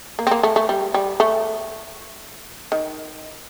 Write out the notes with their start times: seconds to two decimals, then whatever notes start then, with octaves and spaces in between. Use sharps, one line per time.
0.19 A#3
0.27 C4
0.31 A#3
0.43 A3
0.56 A3
0.69 G3
0.94 G3
1.20 A3
2.72 D#3